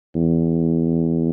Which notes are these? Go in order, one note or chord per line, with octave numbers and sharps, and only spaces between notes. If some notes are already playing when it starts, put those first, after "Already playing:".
E2